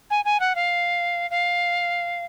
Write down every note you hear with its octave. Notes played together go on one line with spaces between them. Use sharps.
G#5
G#5
F#5
F5
F5